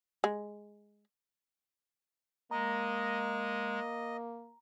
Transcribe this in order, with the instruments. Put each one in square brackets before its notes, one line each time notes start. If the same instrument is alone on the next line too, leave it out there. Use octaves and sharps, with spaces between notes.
[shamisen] G#3
[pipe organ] G#3 [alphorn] A#3 [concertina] D#5 [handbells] A#5